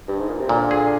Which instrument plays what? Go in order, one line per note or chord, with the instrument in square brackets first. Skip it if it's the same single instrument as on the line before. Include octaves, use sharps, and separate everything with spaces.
[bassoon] G2
G#2
A#2
C3
[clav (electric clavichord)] A#2 [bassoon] D3
[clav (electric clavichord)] G#4